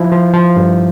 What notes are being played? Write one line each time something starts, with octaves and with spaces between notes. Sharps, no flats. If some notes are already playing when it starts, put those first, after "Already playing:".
Already playing: F3 E4
F3
F3
G2